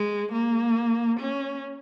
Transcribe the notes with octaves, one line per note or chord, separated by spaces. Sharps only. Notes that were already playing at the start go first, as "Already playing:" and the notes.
Already playing: G#3
A#3
C#4